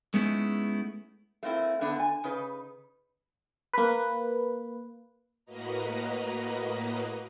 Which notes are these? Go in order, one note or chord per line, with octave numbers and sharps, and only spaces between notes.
G#3 A3 B3 C#4 D#4 E4
A3 A#3 C4 E4
D3 A3 B3 D4
G#5
C#3 D#4 B4
A#3 B4
A2 A#3 F#4 B4 D#5 A#5